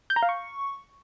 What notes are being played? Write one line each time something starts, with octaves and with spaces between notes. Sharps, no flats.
G6
A#5
F5
C#6